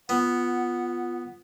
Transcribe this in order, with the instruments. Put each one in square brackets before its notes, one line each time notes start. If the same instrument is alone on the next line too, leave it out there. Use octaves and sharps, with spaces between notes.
[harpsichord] B3 [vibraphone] F4 [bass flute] F#5